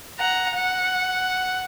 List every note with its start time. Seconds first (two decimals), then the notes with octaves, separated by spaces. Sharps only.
0.19 F#5 A#5
0.55 F#5